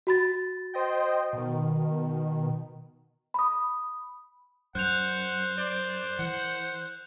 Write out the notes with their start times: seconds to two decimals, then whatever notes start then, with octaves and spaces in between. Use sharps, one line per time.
0.07 F#4 B5 A6
0.74 C5 D#5 G5
1.33 B2 D#3
3.34 B5 D#6
4.75 F#2 C5 F#5 F#6 G6 F7
5.58 C5 D5
6.19 E3 F#5